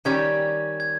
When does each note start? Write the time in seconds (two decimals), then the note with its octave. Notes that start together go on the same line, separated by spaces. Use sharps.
0.05 D#3 G3 C#4 G4 G#6
0.80 G#6